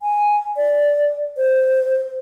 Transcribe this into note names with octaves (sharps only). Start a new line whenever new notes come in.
G#5
D5
C5